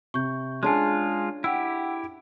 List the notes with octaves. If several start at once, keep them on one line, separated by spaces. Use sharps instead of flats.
C3 C#6 G6
G#3 C#4 D4 F4 G#4 G#5 A5 C6
E4 G4 F#5 G5 E6